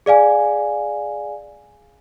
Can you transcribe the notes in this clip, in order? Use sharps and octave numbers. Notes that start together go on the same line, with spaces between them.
G#4 D5 F5 G#5